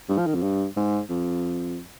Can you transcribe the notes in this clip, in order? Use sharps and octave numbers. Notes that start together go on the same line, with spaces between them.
G2
F3
D#3
F2
G2
G#2
F2